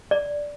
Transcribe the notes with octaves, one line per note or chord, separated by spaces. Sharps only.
D5